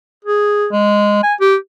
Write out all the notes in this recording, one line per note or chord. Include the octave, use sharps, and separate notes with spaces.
G#4
G#3
G#5
G4